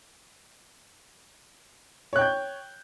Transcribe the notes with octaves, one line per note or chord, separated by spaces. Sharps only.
C#5 G5 F#6 G6